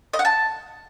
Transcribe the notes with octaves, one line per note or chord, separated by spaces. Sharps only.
D#5
F#5
A5